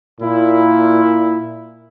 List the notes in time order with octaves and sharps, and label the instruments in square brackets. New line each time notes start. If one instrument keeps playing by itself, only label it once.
[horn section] A#2 E4